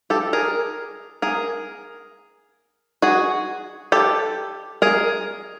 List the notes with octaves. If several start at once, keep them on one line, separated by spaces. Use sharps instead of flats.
G4 A4
G#4 A#4
G#4 A#4
F#4 G#4
G4 A4
G#4 A#4